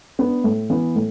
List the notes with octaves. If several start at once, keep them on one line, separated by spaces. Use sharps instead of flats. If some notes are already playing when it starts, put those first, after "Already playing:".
B3 D4
A2
E3 B3
A2